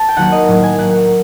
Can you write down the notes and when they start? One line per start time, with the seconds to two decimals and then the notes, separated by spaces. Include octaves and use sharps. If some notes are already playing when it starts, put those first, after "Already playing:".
Already playing: A5
0.08 G5
0.17 D#2 D#3 F#3 A#3 F#5
0.32 D#5
0.48 A2 F#3 A#3
0.63 G#5
0.78 A2 F#3 A#3 F#5
0.94 F#5